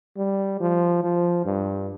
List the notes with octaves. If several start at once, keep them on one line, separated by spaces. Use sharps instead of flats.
G3
F3
F3
G2